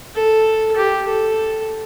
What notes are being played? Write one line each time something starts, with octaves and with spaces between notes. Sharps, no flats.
A4
G4
A4